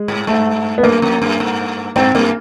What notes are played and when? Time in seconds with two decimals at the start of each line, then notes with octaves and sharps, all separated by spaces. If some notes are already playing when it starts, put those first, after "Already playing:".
Already playing: G#3
0.08 G#2
0.27 G2 A3
0.78 B3
0.83 F#2 A#3
1.02 F2
1.22 F#2
1.40 G2
1.96 G2 C4
2.15 F#2 A#3